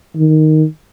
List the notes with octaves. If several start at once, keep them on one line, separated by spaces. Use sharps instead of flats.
D#3